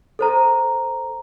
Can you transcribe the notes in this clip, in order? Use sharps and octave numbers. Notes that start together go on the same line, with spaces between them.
A4 C5 A#5